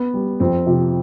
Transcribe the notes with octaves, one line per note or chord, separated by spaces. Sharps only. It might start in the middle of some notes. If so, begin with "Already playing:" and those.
Already playing: B3
G3
F2 C4
C3 F3